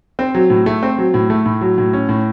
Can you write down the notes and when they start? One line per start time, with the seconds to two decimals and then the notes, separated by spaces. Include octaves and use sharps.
0.19 C4
0.35 F#3
0.50 A2
0.66 A3
0.83 C4
0.98 F#3
1.14 A2
1.30 A3
1.46 A2
1.61 F#3
1.78 A2
1.93 C#4
2.09 A2